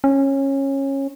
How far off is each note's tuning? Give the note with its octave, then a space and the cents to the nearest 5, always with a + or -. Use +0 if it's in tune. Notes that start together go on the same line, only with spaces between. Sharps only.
C#4 -20